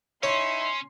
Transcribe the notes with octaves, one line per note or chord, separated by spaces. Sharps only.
C#4 D#4 E4 C#5 E5 C6